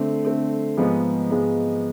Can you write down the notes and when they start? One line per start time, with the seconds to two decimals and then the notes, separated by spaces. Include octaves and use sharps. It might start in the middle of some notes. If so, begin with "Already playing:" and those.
Already playing: D3 A3 C4
0.25 D3 A3 C4
0.77 G#2 F3 G#3 B3
1.30 G#2 F3 G#3 B3